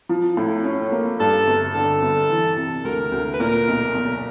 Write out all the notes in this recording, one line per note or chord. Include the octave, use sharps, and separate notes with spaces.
F3
A2
C#4
A#3
G2 A4
G1
D3 A4
G1
E3
C3
D2 A#4
D2
B4
A#2 A#4
B1
B1